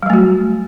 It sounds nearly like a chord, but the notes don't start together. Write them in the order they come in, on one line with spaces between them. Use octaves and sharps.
G3 F#3 A3 F#4